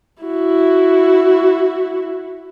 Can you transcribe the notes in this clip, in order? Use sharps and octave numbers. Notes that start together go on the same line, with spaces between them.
E4 F#4